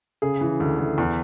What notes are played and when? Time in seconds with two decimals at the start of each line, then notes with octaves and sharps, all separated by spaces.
0.22 C#3 G#4
0.41 E3
0.60 D2
0.79 D2
0.98 E2